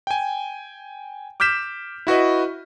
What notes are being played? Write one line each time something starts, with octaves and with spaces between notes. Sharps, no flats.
G5 G#5
D6 F6 G6 B6 E7
E4 F#4 B4 D#5